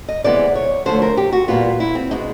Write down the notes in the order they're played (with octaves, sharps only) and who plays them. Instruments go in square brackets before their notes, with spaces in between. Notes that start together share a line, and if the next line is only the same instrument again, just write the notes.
[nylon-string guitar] D#5
C3 E3 G#3 B3 D5
C#5
D3 F3 A3 C5
A#4
G4
F#4
A#2 G3 B3 F4
E4
C4
B2 G#3 B3 D#4